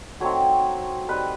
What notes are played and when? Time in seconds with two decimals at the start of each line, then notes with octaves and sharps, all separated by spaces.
0.20 F#3 A3 C4 D#4 C#5
1.09 G3 C4 D#4 B4